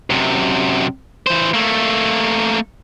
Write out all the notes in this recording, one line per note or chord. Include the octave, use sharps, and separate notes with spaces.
F#2 C3
E3 C5
A3 A#3